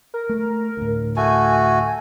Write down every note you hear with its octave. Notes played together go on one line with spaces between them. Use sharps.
A#4
A3
D2 A2
A3 F#4 G#5